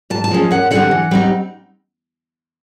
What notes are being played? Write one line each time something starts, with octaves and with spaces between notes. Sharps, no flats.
G#2 A5
A5
F3 G#3 C#4
F#2 F#5
D3 G3 C4 F#5
E3
G3 C4 D#4